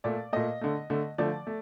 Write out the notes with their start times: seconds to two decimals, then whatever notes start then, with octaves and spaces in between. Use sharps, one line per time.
0.04 A#2 A3 D5
0.33 A#2 A3 D#5
0.61 D3 A3
0.90 D3 A3
1.18 D3 F3 A3 D5
1.47 A3